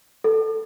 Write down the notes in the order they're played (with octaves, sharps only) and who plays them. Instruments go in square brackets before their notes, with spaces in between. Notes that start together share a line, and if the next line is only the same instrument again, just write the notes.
[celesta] A4